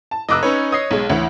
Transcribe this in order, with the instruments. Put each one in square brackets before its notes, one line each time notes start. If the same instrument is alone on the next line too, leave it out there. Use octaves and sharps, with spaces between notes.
[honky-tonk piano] A5
[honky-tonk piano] F1 D6 E6 [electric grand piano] D#5 F#6
[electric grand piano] C#4 D#4 C#5 [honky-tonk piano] B4
[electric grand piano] C#5 D#5 C7 [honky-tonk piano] D#6
[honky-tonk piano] B1 G#3
[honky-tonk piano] D2 E3 [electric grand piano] C#5